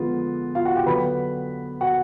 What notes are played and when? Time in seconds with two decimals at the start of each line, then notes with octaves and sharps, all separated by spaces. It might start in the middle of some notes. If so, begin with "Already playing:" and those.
Already playing: D3 F3 G#3 B3 F4
0.55 F4 F5
0.65 F#4 F#5
0.76 G4 G5
0.86 D3 F#3 B3 B4 B5
1.81 F#4 F#5